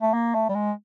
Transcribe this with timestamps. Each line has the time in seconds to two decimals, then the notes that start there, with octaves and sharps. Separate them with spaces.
0.02 A3
0.13 A#3
0.35 A3
0.49 G3
0.55 G#3